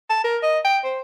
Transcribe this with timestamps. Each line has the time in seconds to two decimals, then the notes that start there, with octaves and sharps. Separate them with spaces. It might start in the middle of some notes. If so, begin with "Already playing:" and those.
0.09 A5
0.24 A#4
0.43 D#5
0.65 G5
0.84 C5